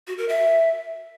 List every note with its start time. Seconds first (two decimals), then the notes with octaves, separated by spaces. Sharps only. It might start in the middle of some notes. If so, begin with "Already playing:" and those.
0.07 F#4
0.18 A#4
0.29 E5